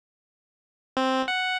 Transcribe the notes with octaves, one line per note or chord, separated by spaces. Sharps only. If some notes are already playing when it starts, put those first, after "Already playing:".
C4
F#5